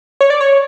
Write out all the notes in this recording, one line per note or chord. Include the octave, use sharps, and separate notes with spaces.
C#5
D5
C#5